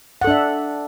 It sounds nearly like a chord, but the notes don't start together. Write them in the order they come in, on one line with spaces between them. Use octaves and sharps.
F#5 A4 D4 E5